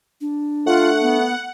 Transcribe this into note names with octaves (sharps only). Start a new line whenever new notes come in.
D4
A3 F4 F#5
B3